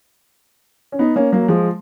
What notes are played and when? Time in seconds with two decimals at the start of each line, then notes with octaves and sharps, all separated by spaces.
0.92 C#4
0.99 B3 D#4
1.16 A#3 C#4
1.32 F#3 A#3
1.48 F3 G#3